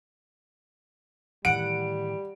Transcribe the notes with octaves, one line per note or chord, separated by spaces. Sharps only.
A2 D#3 E3 G3 F#5 D7